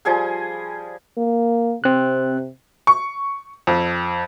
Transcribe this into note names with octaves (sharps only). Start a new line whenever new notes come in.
F3 G3 G#4 G#5
A#3
C3 C4 F#6
C#6
F2